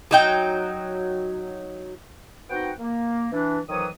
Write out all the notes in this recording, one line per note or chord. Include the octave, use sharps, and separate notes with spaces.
F#3 D#4 G5
B3 C4 D#4 F#4 F#5 G5
A#3
E3 D4
F2 D#3 E3 F#3 C#5 D#6